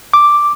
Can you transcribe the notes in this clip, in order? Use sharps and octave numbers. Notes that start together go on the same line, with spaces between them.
D6